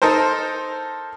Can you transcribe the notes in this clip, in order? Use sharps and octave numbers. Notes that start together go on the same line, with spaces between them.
D#4 A4 A#4 C5